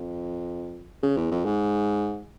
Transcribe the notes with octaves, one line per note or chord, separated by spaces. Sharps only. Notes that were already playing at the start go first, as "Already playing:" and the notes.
Already playing: F2
C#3
E2
F2
G#2